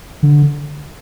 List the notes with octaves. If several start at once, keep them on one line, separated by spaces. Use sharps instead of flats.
D3